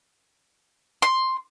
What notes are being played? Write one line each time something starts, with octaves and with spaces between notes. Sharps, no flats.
C6